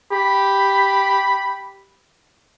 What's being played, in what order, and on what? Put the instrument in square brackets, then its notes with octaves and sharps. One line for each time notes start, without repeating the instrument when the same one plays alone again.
[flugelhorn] G4 [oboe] B5